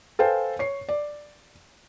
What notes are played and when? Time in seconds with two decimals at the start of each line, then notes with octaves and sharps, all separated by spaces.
0.19 A4 B4 C5 F5 G5 G#5
0.59 C#5 C7
0.89 D5